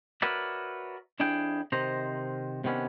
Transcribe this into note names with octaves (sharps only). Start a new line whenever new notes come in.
F#4 A#4 B4 C#5 D5 E5
F2 D4 E4 G#4 G5
C3 D#3 C5 D#5 A#5
C3 D#3 B3 C#4 D4